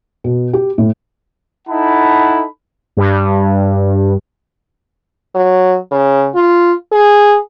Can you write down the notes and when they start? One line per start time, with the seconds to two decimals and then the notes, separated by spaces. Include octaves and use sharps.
0.24 B2
0.53 G4
0.78 A2
1.68 D#4 E4 A4 F#5 A5 B5
2.97 G2
5.35 F#3
5.92 C#3
6.35 F4
6.92 G#4